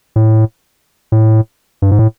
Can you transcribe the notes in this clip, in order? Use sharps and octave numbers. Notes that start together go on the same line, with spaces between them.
A2
A2
G2
G#2
A2